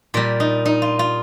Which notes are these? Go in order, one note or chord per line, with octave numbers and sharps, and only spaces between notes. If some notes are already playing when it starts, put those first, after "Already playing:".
A#2 G3 A#4
D#4
D#4
F4
F4